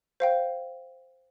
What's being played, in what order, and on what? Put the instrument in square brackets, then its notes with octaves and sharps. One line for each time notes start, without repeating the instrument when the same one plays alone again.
[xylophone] C5 F5 G5